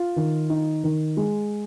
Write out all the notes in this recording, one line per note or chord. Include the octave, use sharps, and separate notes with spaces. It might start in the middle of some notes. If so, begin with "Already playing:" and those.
Already playing: F4
D#3
D#4
D#3
G#3